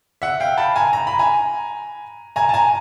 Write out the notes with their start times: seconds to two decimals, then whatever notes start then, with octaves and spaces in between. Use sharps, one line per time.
0.22 E5 F#5
0.40 F5 G5
0.57 A5 B5
0.76 G#5 A#5
0.93 A#5
1.07 B5
1.19 G#5 A#5
2.36 G#5 A#5
2.49 A5
2.54 G#5 A#5